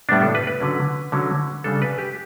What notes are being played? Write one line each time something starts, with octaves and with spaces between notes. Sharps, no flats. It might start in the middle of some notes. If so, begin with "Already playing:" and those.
A2 G3 B3 D4
A4
B4
B4
D3 F#3 C#4
D3 F#3 C#4
C#3 G3 D4 A4
B4
G4